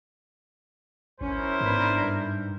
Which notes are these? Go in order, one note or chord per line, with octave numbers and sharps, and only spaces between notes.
G#1 C#4 E4 A#4 C5
G#2 B3 D4 B4
G2